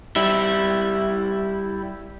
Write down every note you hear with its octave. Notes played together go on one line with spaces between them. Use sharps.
G3 E4